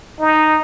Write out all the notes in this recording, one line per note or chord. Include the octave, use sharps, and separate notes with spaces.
D#4